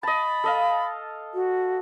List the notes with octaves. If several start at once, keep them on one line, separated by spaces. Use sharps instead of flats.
D#5 A5 B5
A4 D#5 F5
F#4